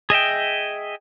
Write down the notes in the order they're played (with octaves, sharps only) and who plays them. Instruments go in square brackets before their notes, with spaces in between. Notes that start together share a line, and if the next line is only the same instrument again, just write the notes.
[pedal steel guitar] G#4 D#5 E5 G5